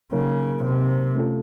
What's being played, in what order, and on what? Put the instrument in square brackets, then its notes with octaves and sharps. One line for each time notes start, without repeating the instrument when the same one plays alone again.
[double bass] C#3 [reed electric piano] F#3 A#3 D#4 A#4 C#5
[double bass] C3
[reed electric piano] A3 C#4 F4 A4